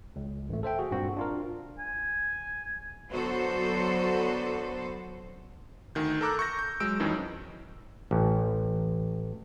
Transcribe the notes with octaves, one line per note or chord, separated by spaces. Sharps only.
C#2
A1 A3
A4 C5 E5 G5
F#4 G#4
G2 A#2 A#3 C4 F#4
D4 F4 A#4
G#5
D3 F#3 B3 F#4 A4 C5
D2 D#3 G6
A4 A#4 A#5 D6 E6 F#6
C#6 G6 A#6
G6
F#3 G#3 E6 D7
F2 D#3 E3 F#3 C#4 D#4
A1